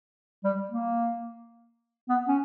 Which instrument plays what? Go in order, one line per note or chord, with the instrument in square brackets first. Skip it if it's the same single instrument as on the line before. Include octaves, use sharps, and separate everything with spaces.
[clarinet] G3
A#3
B3
C#4